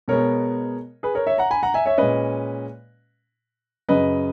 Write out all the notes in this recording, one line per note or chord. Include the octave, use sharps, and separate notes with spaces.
B2 G#3 B3 A#4 C#5
G#4 B4
A#4 C#5
C#5 E5
F#5 A#5
G#5 B5
F#5 A#5
E5 G#5
C#5 E5
A#2 G#3 C#4 B4 D#5
F#2 C#3 F#3 B4 D#5